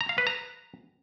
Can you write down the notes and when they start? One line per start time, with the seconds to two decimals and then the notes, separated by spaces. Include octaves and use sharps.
0.01 A#5
0.09 F5
0.18 B4
0.27 A#5